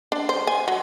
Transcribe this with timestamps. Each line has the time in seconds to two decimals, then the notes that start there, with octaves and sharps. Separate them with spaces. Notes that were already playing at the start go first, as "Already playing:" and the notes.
0.12 D4
0.29 C5
0.47 G#5
0.68 F#3